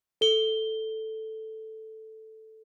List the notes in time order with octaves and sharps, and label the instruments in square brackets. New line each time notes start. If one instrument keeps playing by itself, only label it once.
[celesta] A4 G7